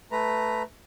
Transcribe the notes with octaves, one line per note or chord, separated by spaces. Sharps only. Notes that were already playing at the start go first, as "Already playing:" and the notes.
A3 B4 A#5